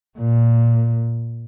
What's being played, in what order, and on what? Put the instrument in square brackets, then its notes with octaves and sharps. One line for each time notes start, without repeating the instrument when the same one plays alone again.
[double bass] A#2